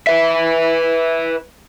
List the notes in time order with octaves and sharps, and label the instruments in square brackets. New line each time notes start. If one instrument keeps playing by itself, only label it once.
[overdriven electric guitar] B4 E5